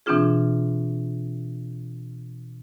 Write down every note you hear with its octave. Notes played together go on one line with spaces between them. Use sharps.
B2 E3 C4 D4 F4 G#4